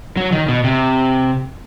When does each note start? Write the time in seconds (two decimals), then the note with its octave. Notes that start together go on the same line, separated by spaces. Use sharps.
0.17 F#3
0.32 D#3
0.48 B2
0.64 C3